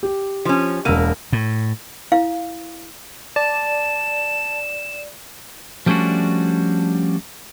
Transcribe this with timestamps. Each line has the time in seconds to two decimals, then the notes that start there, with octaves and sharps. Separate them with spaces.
0.03 G4
0.45 F3 C#4
0.85 E1 B2 A#3 E6 D#7
1.33 A2
2.12 E4 F5
3.36 D5 A5 E7
5.86 F3 G3 A3 C#4 D4 F#4